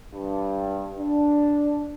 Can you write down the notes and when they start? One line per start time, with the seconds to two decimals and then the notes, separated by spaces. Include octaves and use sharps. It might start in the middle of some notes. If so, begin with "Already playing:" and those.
0.14 G2
0.99 D4